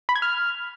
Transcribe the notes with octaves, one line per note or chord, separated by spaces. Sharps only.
B5
G#6
F6